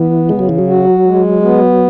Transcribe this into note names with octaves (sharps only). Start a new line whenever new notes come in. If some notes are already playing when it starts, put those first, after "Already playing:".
Already playing: E3 B3
C#3 G#3
F#3
E3
F#3
F#4
G#3
B3